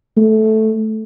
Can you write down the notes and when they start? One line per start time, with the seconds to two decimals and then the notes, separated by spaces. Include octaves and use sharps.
0.17 A3